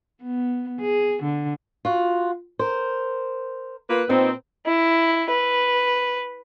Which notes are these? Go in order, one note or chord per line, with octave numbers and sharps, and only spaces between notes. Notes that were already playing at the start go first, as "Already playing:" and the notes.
B3
G#4
D3
F4 F#4
A#4 C5
A#3 F4 B4
A#2 B3 C4 D#4
E4
B4